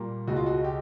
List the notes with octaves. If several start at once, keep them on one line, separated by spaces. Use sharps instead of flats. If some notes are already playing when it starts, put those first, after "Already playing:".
Already playing: A#2 G3 A#3
C#2 B2 G#3 F#4
F4
F#4
G4